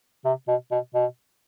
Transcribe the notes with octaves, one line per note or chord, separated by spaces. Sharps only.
C3
B2
B2
B2